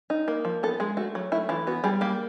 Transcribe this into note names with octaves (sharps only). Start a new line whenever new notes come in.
D#4
A#3
F3
B3 A4
G#3 G#4
A3 F#4
F#3
A3 E4
E3 F4
B3 F#4
G3 G#4
A#3 G4